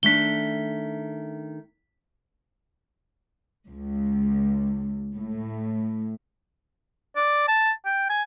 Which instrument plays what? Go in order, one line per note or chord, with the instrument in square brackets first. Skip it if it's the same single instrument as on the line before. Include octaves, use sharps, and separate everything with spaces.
[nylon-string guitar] D#3 A3 D4 [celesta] B6 G7
[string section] C#2
A2
[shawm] D5
A5
G5
G#5